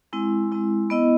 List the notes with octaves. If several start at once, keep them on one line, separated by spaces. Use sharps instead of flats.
G#3 C4 E4
G#3 C4 E4
B3 E4 D#5